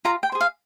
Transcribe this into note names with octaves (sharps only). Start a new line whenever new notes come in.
F4 A#5
G5
G#4 C5
F5